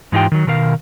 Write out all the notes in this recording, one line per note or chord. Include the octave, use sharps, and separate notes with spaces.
G#2 E3 D#4 F4 G4 G5
D#3 F#3
B2 D#3 A#4 F5